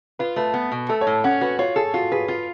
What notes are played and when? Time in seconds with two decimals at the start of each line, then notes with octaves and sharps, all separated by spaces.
0.19 F4 B4
0.36 A3 B4
0.54 B3
0.72 B2
0.89 A3 A4
1.01 C#5
1.07 A2
1.24 C#4 F#5
1.41 F#4 B4
1.59 F4 C#5
1.76 G#4 A4
1.94 F4 F#4
2.12 G#4 B4
2.28 F4 F5